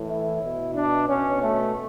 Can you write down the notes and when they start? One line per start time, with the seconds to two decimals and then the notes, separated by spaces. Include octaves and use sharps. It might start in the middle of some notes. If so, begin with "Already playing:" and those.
Already playing: A2 E3
0.09 E4
0.43 B2
0.75 D4
1.09 B2 C#4
1.42 A3